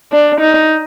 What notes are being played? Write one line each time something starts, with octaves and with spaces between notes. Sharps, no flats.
D4
D#4